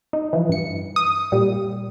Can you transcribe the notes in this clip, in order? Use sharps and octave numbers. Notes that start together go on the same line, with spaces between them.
D#4
E3 F3
G2 C#7
D#6
A#2 G3